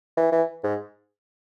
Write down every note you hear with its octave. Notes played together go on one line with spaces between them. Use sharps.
E3
E3
G#2